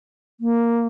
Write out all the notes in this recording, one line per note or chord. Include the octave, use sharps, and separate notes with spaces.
A#3